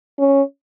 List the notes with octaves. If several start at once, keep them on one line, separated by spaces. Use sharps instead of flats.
C#4